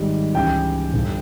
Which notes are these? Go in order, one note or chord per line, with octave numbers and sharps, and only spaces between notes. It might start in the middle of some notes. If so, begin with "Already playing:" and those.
Already playing: G#1 G#2 G3
C#2 C#3 E3 G4 G5
G1 G2 G3